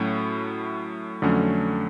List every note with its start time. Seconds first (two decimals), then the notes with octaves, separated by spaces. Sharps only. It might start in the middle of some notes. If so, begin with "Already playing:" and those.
Already playing: A2 F#3 A3 C#4 E4
1.22 F2 D3 F#3 A3 C#4